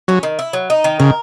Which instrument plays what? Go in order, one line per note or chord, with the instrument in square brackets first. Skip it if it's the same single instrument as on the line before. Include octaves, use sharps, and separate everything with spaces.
[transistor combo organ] F#3 [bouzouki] C#4
[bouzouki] D#3
E4
F#3
D#4
D#3
[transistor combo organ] C#3 [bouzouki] A#4